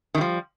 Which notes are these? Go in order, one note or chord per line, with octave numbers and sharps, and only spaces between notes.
D#3 F3 G3